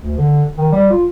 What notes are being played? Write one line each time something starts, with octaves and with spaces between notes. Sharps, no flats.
D2
D3
D#3
G3
F4